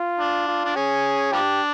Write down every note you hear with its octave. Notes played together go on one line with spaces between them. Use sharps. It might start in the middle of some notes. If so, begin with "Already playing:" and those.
Already playing: F4
D4
F4
D4
C#4 G#4
F3 G3 D4 G4